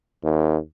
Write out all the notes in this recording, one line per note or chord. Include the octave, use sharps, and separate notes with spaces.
D#2